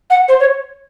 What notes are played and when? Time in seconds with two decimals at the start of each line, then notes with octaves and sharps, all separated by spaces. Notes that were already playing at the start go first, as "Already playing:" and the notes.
0.10 F#5
0.28 C5
0.40 C#5